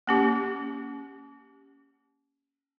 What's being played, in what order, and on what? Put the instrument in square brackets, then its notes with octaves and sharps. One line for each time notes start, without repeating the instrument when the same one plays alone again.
[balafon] A#3 C#4 G4